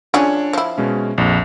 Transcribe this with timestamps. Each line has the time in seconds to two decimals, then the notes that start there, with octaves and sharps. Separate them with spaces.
0.14 F3 C#4 D4 G#4 C#5
0.53 F3 E4
0.78 B2 G#3 C#4
1.18 A#1 F2